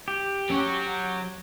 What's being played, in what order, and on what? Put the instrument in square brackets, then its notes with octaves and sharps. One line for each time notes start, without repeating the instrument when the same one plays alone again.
[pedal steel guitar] G4
[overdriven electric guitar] F#3 C#5 [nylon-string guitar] C#4